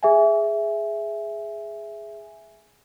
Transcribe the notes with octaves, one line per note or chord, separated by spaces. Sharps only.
G#4 E5 G#5